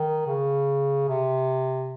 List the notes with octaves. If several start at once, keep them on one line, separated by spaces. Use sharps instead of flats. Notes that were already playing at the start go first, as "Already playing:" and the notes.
Already playing: D#3
C#3
C3